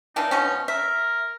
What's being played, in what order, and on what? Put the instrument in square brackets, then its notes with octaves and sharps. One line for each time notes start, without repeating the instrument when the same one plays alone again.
[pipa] E3 D4 F4 [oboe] D#4
[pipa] B2 F3 C#4
[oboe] A#4 [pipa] E5